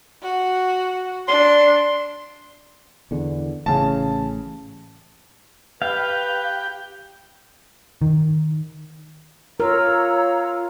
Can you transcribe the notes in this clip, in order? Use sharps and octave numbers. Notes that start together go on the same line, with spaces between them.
F#4
D4 C6
E2 D3
A1 C#3 A5
G4 B4 F5 G5
D#3
F4 A#4 C#5 A#5 E6